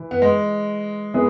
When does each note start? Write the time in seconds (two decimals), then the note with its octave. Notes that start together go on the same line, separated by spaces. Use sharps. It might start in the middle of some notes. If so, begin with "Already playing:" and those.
Already playing: E3
0.11 B3
0.22 G#3
1.14 E3 B3 G#4